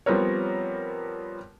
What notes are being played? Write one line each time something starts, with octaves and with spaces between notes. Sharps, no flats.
F3 G3 B3 C4 A#4 C#5